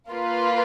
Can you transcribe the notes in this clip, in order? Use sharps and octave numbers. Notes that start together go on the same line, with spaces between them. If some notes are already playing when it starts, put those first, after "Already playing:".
A#3 F4 B4